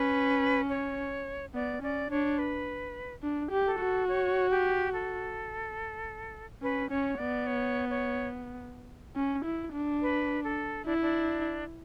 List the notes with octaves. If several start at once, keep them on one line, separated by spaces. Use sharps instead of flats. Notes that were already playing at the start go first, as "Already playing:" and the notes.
Already playing: C#4 B4
C#5
B3 D5
C#4 D5
D4 C#5
B4
D4
G4
A4
F#4
C#5
G4
A4
C#4 B4
C#4 C#5
B3 D5
C#5
C#5
C#4
E4
D4
B4
A4
D4 E4
D4